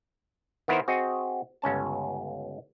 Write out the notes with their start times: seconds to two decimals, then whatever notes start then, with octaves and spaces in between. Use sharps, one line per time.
0.68 D#3 B3 E4 A#4 C5
0.88 C4 F#4 G#4 D#5
1.62 G1 C#2 C#4 A5